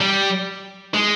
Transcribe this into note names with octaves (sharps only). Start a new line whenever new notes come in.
G3
G#3